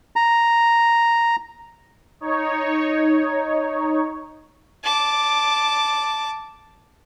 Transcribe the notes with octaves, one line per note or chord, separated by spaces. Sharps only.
A#5
D#4 C#5
A5 D6